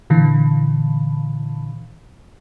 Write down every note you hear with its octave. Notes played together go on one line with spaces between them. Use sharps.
A#2 D3 E3